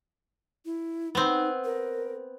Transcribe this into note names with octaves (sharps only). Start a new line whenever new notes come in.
E4
B3 C4 D#4
A#4